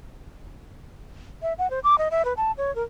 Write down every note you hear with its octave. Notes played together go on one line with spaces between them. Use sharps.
E5
F#5
C5
D6
D#5
E5
B4
A5
C#5
A#4